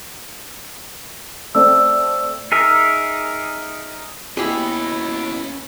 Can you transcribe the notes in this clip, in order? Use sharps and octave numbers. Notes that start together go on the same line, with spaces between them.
A3 C4 D5 E6
D#4 G#4 A#4 E5
D#2 B2 B3 C#4 E4 G4 G#4 D#5